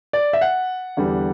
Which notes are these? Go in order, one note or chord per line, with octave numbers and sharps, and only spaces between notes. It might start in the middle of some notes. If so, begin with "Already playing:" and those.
D5
E5
F#5
E2 D3 G3